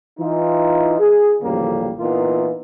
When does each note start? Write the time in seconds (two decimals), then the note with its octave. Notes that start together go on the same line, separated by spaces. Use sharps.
0.19 E3 D#4 F4
0.99 G#4
1.42 A1 D2 C#3 F3 G3 A#3
1.99 A#2 E3 A#3 B3 D#4 F4